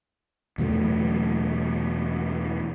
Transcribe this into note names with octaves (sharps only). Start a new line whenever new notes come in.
E2 B2 F#3 A3